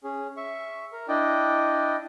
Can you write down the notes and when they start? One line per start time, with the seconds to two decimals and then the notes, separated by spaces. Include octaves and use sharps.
0.04 C#4 G#4
0.37 E5 C#6
0.92 A#4
1.08 D4 E4 D5 D#5 G5